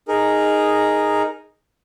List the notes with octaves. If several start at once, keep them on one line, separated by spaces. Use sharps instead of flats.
D#4 G#4 A#4